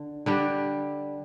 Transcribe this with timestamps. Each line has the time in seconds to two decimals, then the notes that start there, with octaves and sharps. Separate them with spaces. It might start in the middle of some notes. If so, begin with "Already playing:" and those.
Already playing: D3
0.26 D3 G3 D4 G4